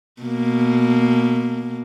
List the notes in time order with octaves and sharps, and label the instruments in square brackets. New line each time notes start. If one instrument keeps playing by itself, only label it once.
[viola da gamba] B2 A#3